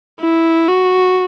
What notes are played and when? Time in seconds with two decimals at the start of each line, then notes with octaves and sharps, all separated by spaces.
0.20 E4
0.69 F#4